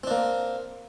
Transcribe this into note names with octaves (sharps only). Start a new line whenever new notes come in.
A#3 C4 D4